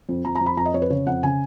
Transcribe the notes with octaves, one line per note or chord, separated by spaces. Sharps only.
F2
F2 A#5
A#5
F2
B5
F2 A#5
D#5
F2 C#5
B4
C#3 C#5
F2 F#5
C#3 G#5